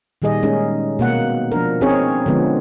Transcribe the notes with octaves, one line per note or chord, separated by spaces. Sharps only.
A#2 D#3 G3 G#4 D#5
G#3 C#4 D#4
B2 A#3 F#5
F3 D4 A#4
C4 C#4 D#4 G#4 A#4 C#5
D3 F3 G#3 B3